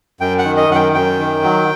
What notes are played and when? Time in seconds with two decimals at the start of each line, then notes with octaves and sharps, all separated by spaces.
0.21 F#2 G5
0.39 F#5
0.45 D#3
0.57 D#5
0.69 F#2 F#5
0.75 G5
0.94 F#2 G5
1.19 D#3
1.44 F#3